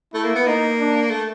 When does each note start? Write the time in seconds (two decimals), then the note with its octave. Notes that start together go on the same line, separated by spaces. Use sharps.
0.13 A3 E4
0.25 A#3
0.36 B3
0.46 A#3 D#4
0.79 D4
1.11 A3